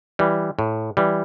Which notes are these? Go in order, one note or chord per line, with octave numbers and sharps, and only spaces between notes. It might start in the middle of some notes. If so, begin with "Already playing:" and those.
E3 G3
A2
E3 G3